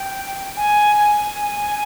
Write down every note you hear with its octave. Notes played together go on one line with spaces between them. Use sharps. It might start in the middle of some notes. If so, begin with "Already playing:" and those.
Already playing: G5
G#5
G#5